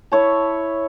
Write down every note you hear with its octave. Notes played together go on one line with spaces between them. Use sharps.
E4 C#5 A5